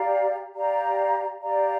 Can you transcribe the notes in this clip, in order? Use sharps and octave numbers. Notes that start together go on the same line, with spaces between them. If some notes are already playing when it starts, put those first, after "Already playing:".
Already playing: G4 D5 F5 A#5
G4 D5 F5 A#5
G4 D5 F5 A#5